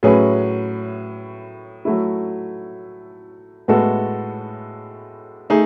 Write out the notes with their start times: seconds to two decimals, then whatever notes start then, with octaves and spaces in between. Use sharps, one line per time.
0.03 A2 F#3 C#4 G#4 B4
1.85 F#3 A3 E4
3.68 A2 G#3 B3 F#4 A4
5.50 A3 D#4 G#4